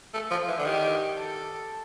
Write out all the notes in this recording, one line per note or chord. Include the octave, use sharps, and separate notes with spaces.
A3
F3
E3
D3
D#3 G4
A4